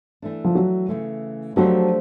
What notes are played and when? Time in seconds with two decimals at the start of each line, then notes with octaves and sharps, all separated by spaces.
0.22 E3 A3 D4
0.44 F3
0.55 F#3
0.89 C#3 E3 A3
1.56 F3 F#3 A3 D4 G4 C5